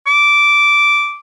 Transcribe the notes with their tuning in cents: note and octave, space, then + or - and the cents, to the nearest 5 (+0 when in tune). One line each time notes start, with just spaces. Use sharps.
D6 -10